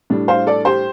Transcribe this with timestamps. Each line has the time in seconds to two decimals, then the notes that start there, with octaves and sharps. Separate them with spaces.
0.10 A2 G3 D4
0.28 C5 F5
0.47 A4 D5
0.65 G4 C5